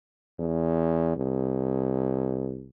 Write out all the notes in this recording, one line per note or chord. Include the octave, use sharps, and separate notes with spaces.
E2
C2